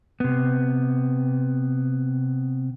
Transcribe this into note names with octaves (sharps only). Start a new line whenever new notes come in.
C3 B3